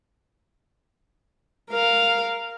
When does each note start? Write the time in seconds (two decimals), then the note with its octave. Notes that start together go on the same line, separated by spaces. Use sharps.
1.71 A#4 F5